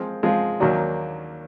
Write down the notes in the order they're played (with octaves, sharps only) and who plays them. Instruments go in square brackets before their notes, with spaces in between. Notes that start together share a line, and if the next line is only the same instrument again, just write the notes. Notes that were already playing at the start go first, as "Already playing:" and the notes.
Already playing: [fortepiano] F3 G#3 C4 F4
F3 G#3 C4 F4
D#2 D#3 F#3 A#3 D4